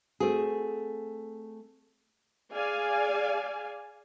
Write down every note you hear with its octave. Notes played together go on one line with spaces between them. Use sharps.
A3 C4 F#4 G#4
G#4 D5 F5 G#5